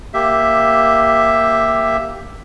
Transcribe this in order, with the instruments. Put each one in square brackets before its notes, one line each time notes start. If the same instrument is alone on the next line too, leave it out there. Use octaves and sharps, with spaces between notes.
[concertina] A#3 G4 E5